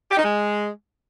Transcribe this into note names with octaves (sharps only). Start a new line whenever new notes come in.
G4
D#4
G#3